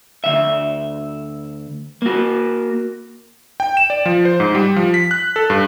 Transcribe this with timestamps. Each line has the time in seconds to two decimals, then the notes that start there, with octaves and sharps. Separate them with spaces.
0.24 D2 C#3 E5
2.02 A#3 F#4
3.60 G5
3.77 E7
3.90 D5
4.06 F3
4.25 C5
4.40 G#2
4.55 G3
4.76 F3
4.94 B6
5.11 F#6
5.36 A4
5.50 G2